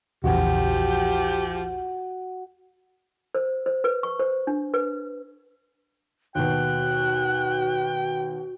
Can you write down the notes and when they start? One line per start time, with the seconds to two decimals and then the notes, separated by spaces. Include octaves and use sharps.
0.24 A#1 E2 C#3 F3 F#4 G4
3.35 C5
3.66 C5
3.84 B4
4.03 C#6
4.19 C5
4.47 D4
4.74 B4
6.35 D#2 B2 F#4 G5 F#6